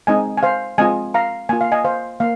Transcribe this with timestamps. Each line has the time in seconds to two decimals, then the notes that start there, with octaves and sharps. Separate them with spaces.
0.07 G#3 C4 D#4 D#5 G#5
0.37 G#5
0.43 C5 F5
0.78 G#3 C4 F4 D#5 G#5
1.14 F5 A#5
1.49 A#3 F4 G#5
1.61 F5
1.72 D#5 G#5
1.85 C5 F5
2.20 A#3 F5